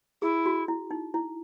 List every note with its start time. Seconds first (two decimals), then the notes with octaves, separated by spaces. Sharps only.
0.22 E4 G#4
0.46 F#4
0.68 E4
0.91 D#4
1.14 E4